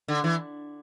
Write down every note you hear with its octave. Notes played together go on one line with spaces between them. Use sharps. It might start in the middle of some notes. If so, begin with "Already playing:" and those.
D3
E3